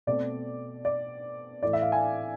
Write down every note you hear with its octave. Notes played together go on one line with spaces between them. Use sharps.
B2 A3 C4 D5
D5
A2 E3 A3 D5
E5
F5
G#5